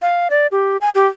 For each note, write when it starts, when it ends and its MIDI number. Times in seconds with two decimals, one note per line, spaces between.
0.02 0.28 77
0.30 0.47 74
0.52 0.77 67
0.81 0.89 80
0.95 1.07 67